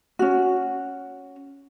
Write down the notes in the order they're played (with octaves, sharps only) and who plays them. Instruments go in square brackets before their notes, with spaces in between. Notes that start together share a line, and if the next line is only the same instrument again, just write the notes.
[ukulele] C#4 F#4